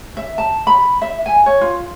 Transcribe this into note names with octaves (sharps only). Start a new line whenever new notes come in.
E5
A5
B5
E5
G#5
C#5
F4